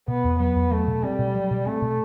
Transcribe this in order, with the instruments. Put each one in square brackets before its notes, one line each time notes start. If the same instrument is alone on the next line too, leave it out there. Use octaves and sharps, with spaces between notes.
[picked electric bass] B2 [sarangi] B3
[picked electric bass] E2
[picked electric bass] F#3 [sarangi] B3
[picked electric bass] E2
[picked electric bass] F#3 [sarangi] A3
[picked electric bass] B2
[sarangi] G3 [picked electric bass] C4
[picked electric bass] B2
F#3
B2
[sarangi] A3 [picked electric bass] C4
[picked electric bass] B2